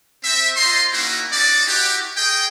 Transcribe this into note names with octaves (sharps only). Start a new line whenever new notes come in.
C4 E5
F4 C5 D#5 C6
A#3 C#4 D#4 E4 F#4
C#4 D#4 F#4 D5
E4 F#4 G4
G#4 D#5 G5